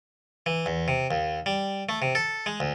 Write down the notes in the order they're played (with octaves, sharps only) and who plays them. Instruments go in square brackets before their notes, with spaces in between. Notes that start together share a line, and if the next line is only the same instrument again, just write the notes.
[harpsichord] E3
E2
C3
D#2
G3
A3
C3
A4
G#3
D2